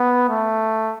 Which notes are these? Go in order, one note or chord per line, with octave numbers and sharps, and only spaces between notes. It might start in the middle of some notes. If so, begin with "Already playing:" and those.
Already playing: B3
A3